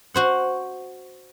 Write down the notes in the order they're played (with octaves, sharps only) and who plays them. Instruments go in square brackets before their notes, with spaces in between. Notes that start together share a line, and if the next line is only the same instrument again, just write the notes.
[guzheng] F#4 C5 F#5